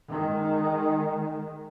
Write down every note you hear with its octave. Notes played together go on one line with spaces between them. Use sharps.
D#3 G#3